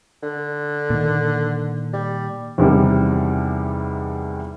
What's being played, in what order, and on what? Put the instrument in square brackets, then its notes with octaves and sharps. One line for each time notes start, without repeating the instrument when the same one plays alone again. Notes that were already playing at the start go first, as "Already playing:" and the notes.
[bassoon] D3
[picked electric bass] A#2 D#3
[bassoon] G3
[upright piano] E2 C3 D#3 G3